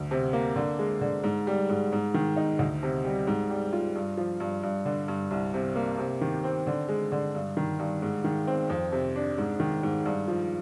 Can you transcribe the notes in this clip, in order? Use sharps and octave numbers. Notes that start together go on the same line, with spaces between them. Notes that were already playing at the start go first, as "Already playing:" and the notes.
Already playing: D2
C3
A#3
D3
G#3
D3
G#2
G3
G#2
G#2
D#3
D#4
D2
C3
G3
G#2
G3
F4
G2
F3
G2
G2
D3
G2
C2
C3
A#3
C3
D#3
C4
D3
G#3
D3
G2
D#3
G2
G#2
D#3
C4
F2
C3
D4
G#2
D#3
G#2
G2
F3